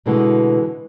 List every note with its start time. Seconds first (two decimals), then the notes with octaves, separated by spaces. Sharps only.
0.06 B2 D3 E3 G#3 A3 B3